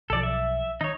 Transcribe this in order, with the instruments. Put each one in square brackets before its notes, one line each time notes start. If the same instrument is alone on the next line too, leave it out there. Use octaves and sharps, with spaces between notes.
[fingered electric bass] B1 D#3 F3 [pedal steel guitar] A4 D5
[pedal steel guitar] E5
[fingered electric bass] D#3 [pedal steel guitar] D#4 C#5